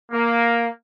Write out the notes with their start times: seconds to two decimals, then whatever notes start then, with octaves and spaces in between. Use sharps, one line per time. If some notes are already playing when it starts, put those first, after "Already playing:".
0.12 A#3